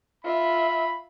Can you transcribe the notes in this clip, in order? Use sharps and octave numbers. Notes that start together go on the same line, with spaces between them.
F4 E5 B5